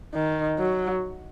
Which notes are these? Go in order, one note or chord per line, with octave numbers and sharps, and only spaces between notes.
D#3
F#3